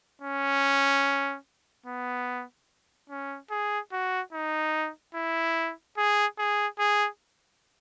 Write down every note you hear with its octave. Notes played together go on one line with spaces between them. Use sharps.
C#4
B3
C#4
G#4
F#4
D#4
E4
G#4
G#4
G#4